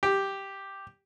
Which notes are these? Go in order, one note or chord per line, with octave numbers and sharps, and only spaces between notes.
G4